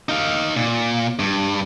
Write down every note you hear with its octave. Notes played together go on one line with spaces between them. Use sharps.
D#4 F5
A#2
G2